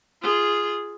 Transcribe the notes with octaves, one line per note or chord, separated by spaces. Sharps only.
F4 G#4